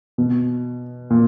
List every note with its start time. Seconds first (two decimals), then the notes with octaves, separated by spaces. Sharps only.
0.18 B2
1.10 A#2